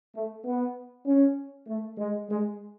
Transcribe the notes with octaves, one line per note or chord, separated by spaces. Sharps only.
A3
B3
C#4
A3
G#3
G#3